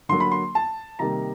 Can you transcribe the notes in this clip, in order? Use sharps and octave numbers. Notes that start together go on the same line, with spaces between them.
D3 F#3 A#3 C6
B5
C6
A5
C3 D#3 G3 A#3 A#5